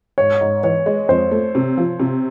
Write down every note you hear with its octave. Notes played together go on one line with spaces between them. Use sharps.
G#2 C#5
G#2
E3 C#5
G#3
F2 C5
A3
C3
F3
C3